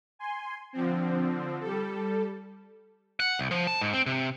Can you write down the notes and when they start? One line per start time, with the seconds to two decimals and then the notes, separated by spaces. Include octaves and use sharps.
0.19 G#5 C6
0.73 D3 F3 C4
1.61 G3 A4
3.20 F#5
3.39 C2
3.51 F3
3.67 A5
3.81 G#2
3.93 C4
4.06 C3